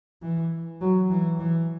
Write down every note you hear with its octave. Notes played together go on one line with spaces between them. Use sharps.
E3
F#3
E3
E3